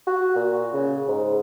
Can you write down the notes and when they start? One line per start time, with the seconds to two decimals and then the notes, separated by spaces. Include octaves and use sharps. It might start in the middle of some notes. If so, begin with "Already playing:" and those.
0.07 F#4
0.36 A#2
0.73 C#3
1.08 G#2